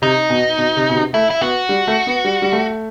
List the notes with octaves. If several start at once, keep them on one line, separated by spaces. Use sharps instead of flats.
C3 D#4
B2
B2
C3
B2
C3
A3 E4
E4
B3 F#4
G3
A3
B3
G3
G3
A3